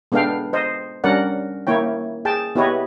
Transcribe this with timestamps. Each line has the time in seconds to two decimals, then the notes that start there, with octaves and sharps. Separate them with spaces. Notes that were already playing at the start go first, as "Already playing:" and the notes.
0.12 G#3 B3 D4 A4 F5 G5
0.53 C5 D#5
1.04 G3 C#4 D4 A#4 D5 F#5
1.67 A#3 E4 C#5 G5
2.25 G#4 G5 A5
2.55 B3 E4 G4 B4 C#5 D#5